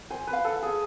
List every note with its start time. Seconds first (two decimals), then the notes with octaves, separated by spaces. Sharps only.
0.11 C5 G#5
0.27 B4
0.33 F5
0.45 A4
0.56 F5
0.63 G#4